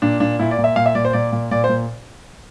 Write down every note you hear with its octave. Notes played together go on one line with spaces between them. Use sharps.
A#2 D4
A#2 D4
A#2 E4
D5
A#2
E5
A#2 F5
E5
A#2 D5
C5
A#2 D5
A#2
A#2 D5
C5
A#2